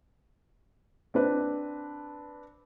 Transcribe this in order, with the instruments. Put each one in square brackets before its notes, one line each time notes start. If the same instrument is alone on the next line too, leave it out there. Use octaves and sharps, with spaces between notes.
[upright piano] C4 D4 B4